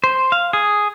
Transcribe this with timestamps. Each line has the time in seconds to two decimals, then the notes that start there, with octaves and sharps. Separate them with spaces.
0.04 C5
0.32 F5
0.53 G#4